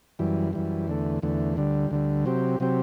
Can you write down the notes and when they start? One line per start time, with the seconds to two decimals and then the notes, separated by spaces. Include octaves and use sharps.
0.19 F#2 E3 G3
0.53 F#2 E3 G3
0.88 E2 D3 A3
1.22 E2 D3 A3
1.57 D2 D3 G3
1.91 D2 D3 G3
2.25 C3 F#3 C4 G4
2.60 C3 F#3 C4 G4